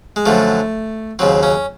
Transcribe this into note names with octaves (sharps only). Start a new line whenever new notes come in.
G#3
F#2 D3 F3 A3
D#2 C#3 F#3 C4
C#4